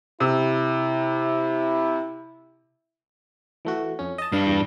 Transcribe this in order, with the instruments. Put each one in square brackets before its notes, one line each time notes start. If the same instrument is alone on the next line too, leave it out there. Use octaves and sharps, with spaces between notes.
[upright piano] C3 [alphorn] E4
[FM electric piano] E3 A3 F#4
F2 C#4
D#5 A5
[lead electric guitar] G2 D4 [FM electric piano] F5
[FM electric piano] E2